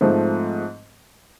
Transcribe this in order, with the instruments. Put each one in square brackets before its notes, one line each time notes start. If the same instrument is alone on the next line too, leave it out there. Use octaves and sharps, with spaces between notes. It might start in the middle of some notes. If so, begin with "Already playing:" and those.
[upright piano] G#2 F3 A3 C4